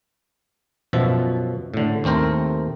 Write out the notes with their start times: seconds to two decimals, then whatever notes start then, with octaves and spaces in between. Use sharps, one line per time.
0.93 F#2 B2 F3 E5
1.74 A2 D3
2.04 D#2 A3 C4 A#4 C5